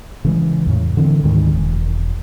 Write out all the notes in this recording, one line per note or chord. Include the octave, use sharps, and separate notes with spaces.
C#3 E3 G#3
E2 A2 C#3
D3 E3 B3 C4
D2 G#2 D#3 G#3
E1